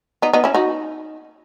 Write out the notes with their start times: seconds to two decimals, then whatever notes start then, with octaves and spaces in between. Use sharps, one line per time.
0.22 B3 D#4
0.33 B3 D#4
0.44 C#4 E4
0.54 D#4 F#4